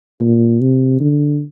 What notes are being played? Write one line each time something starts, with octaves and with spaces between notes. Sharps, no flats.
A#2
C3
D3